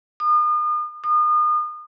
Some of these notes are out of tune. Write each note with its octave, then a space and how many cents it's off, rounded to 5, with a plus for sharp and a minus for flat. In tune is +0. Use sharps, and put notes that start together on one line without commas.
D#6 -40
D#6 -35